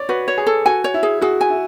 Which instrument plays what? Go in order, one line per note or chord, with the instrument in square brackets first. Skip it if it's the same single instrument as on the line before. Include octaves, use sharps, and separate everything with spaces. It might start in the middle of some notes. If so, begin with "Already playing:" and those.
Already playing: [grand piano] C#5 D5
[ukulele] F#4 [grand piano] B4
[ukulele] C#5
[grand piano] G#4
[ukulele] A4
[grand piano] F#4 [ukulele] G#5
[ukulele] C#5
[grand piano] E4
[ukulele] G#4
[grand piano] F#4 [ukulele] G#4
[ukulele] G#5
[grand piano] E4